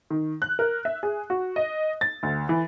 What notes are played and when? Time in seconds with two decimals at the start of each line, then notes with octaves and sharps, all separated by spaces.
0.10 D#3
0.42 F#6
0.59 A#4
0.85 E5
1.03 G#4
1.30 F#4
1.56 D#5
2.01 A6
2.23 D2
2.49 E3